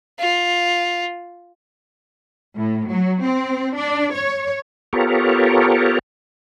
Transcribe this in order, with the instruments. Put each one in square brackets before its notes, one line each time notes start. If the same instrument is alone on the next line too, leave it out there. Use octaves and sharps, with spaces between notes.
[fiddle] F4
[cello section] A2
F#3
C4
D4
C#5
[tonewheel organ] B3 F4 G4 A4 A#4 C#5